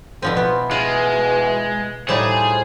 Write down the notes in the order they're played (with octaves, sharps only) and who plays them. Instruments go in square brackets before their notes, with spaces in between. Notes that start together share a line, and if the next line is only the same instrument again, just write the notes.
[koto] B2 F3 C4 [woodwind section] D3
[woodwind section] B2 E3 [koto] B3
[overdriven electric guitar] G#3 [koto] F4
[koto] A2 G3 A5 [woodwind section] F3 D#4 C5 [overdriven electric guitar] G#4